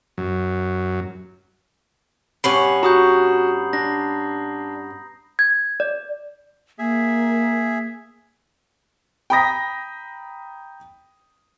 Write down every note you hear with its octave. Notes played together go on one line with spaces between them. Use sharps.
F#2
G2 B3 C#4 B5 C7 F#7
F#4 A#5 D#6 G6
D4 A#6
G#6
D5
A#3 G#4 E5
G5 A#5 B5 D#6 A#6 B6